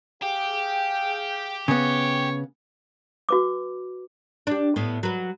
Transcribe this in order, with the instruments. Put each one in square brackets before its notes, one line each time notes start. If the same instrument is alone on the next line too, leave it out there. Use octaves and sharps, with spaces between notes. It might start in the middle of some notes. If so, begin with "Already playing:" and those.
[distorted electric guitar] G4 [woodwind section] G#4 F5 G5
[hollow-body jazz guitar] C#3 B3 [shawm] C#5
[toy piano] F#4 B4 D6
[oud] D4 G4
A2 B3
F#3 B4